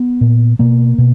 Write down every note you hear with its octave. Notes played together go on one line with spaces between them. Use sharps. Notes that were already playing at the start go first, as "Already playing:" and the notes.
Already playing: B3
A#2
B2 A#3
B2